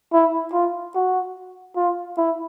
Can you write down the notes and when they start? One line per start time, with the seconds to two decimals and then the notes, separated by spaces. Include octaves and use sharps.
0.13 E4
0.53 F4
0.95 F#4
1.76 F4
2.18 E4